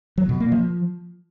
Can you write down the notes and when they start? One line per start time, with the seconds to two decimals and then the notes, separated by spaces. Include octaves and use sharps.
0.18 F#3
0.29 B2
0.40 A#3
0.52 F3